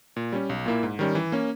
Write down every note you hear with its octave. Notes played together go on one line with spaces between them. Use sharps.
A#2
G3 C#4
B1
A#2 A#3 E4
G#2
D#3 G3 C#4
E3
A#3 C#4